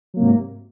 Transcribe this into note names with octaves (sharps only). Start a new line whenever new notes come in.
G#2 C3 F#3 A#3